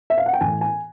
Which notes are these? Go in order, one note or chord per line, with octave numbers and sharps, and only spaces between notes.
E5
F5
F#5
G5
A2 E3 G#5
G#5